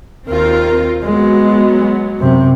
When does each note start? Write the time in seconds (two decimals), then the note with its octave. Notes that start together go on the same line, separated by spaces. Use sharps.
0.28 D#2 C4 F4 A#4
1.03 F#3 G#3 B3
2.20 F#2 C3